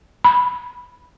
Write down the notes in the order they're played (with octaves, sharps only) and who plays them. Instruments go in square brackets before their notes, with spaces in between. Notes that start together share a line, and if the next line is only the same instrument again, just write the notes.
[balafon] B5